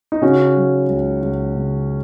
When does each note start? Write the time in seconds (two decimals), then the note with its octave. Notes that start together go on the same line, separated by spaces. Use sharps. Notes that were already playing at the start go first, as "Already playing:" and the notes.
0.12 D#4
0.21 C#3 C#4 F#4
0.56 F#3
0.88 C#2
1.23 C#2
1.56 C#3